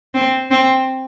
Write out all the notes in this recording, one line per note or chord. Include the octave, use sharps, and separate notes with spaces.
C4
C4